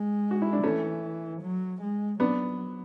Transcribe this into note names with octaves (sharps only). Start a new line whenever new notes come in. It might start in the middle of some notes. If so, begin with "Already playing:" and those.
Already playing: G#3
F#4
E4
D4
E3 A3 C#4
F#3
G#3
F#3 B3 D4